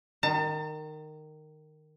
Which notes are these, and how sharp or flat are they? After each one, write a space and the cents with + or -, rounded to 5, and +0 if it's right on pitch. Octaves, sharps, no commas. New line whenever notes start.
D#3 -15 A5 +35